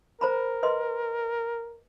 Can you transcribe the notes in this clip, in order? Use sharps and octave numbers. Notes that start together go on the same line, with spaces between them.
A#4 C5 A#5 B5
B4 D#5 C6